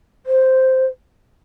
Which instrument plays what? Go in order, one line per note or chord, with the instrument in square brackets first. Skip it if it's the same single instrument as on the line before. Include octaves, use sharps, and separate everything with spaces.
[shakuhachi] C5